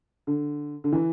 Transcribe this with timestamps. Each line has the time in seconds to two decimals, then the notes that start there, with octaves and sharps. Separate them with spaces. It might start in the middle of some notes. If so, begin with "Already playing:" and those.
0.27 D3
0.84 D3
0.93 E3